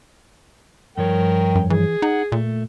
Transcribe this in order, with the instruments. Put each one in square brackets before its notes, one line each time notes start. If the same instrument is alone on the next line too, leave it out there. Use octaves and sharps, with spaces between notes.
[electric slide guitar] G2 F3 C#5 [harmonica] A#4 G5
[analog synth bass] F#2
[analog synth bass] E3 [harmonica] G#4
[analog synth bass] D#4 [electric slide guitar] F#5
[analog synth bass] A#2 [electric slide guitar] A3